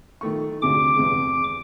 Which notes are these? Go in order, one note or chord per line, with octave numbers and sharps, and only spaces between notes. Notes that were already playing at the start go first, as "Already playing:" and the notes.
D#3 A3 C#6
D2 C3 G#4 D6
E2 C3 G#3